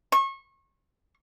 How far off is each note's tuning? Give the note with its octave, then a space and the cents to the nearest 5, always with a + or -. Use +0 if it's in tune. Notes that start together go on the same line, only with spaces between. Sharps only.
C#6 -30